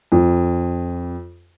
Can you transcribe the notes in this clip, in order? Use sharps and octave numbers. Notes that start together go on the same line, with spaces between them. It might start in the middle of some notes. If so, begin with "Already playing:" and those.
F2